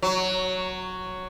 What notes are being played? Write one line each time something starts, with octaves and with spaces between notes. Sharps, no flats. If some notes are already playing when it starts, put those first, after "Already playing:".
F#3